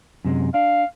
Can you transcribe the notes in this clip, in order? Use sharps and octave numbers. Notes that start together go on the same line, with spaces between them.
F#2 C3 G#3
D4 F5